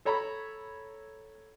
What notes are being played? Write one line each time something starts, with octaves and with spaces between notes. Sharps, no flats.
A4 C#5 A#5 B5